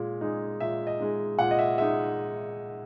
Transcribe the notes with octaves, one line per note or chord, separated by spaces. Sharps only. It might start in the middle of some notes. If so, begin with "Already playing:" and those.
Already playing: A#2 G#3
G#3 D#4
A#2 E5
D#5
G#3 D#4
A#2 F#5
D#5
E5
G#3 D#4 E5